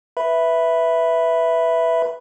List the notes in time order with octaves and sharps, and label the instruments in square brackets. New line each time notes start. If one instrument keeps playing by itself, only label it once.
[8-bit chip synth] B4 E5 B5